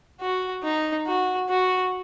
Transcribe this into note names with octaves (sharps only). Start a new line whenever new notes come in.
F#4
D#4
F#4
F#4